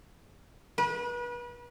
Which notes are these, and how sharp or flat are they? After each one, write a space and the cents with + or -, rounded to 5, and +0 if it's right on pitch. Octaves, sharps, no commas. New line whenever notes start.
B4 -35